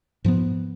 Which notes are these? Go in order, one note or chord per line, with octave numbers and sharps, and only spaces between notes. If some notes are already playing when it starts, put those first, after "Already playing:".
G#2 F3 B3